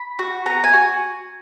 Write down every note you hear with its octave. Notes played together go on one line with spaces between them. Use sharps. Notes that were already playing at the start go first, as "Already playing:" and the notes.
Already playing: B5
F#4
B3 A#5
G#5
F#4